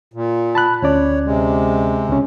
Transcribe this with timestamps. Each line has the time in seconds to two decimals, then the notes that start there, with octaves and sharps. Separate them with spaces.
0.14 A#2
0.55 A5 B5 F#6
0.82 D2 C#4 C#5 D5
1.25 C3 G#3
2.09 C#2 C#4